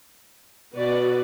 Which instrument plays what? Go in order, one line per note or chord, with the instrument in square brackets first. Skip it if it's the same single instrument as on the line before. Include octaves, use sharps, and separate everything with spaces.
[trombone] B2 [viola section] F#4 B4 D5